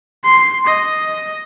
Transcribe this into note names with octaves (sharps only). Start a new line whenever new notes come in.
C6
D#5